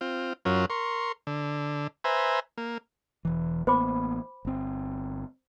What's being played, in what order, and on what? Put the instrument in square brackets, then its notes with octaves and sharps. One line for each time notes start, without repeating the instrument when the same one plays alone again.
[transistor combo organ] C4 F4
F#2 F#3 C#4 F4 A#4
A#4 C6 C#6
D3
B4 C5 E5 G#5 A#5
A#3
[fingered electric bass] E1 E3
[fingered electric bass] A1 A#3 B3 [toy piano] C5 B5 D6
[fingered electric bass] G1 C4